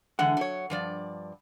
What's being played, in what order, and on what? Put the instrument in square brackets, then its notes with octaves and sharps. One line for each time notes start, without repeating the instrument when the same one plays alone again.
[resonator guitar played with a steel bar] D3 E3 G#3 [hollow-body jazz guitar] F#5
[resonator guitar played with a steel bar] F#3 C#5
G2 F3 D5